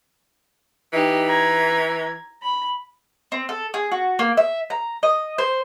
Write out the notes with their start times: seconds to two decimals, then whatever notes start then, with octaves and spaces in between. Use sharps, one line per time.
0.93 E3 D#4 G4
1.27 A#5 G#6
2.42 B5
3.32 C4
3.49 A4
3.74 G#4
3.92 F#4
4.19 A#3
4.37 E5
4.70 A#5
5.03 D#5
5.38 C5